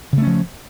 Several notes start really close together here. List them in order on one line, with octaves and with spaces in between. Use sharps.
C#3 A3 C#4 F3